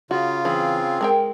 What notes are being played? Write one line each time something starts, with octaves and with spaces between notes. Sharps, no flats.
C#3 F4 F#4
E3 C4 G#4
G#3 A#4 G5